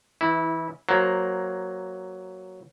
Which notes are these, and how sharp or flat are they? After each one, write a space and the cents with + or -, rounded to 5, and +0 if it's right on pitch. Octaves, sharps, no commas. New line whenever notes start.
E3 +0 E4 -20
F#3 +5 A#3 +0 C5 +0